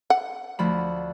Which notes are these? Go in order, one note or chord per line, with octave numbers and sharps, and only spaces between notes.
F#5
D2 F3 B5